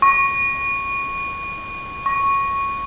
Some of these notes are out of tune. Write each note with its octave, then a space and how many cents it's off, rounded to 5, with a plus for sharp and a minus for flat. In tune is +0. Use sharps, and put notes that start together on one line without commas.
C#6 -10
C#6 -5